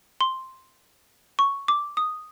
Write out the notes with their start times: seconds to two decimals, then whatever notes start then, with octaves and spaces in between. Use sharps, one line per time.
0.21 C6
1.39 C#6
1.68 D6
1.97 D#6